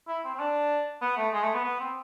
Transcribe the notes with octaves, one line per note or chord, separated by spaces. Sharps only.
E4
C4
C4
D4
B3
A3
G#3
A3
B3
B3
C4